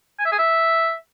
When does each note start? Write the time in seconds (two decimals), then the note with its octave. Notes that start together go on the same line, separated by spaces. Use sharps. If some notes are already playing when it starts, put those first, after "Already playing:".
0.19 G#5
0.26 E5
0.32 G#4
0.39 E5